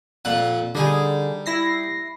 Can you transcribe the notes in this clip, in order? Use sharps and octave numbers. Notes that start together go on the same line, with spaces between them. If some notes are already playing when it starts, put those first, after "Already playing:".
F2 A#2 F#5
D3 G3 D#4 G#4
E4 A#6 C7